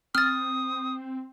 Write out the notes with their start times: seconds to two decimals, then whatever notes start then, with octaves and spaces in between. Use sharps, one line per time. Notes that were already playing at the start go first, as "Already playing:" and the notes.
0.15 C4 D#6 F6 A6